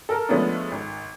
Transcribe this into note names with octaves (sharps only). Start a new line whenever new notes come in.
A4 A#4
F3 G#3 A3 B3 C#4 D4
G#1